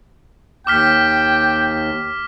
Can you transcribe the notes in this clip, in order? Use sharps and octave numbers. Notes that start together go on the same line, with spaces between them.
D#2 G5 D6 F6 B6